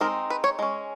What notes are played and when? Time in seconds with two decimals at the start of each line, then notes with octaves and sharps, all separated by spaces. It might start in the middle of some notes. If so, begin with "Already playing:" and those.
0.01 G#3 C4 D#4 A#4
0.30 B4
0.44 C#5
0.59 G#3 C#4